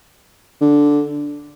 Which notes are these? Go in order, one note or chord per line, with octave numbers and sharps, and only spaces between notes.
D3